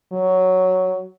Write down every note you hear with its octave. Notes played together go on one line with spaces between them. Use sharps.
F#3